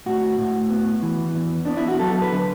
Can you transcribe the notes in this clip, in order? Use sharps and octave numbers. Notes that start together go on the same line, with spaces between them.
A2 F#4
A2
B3
E3
E2
B3 D4
E4
F#4
F#3 A4
B4
D3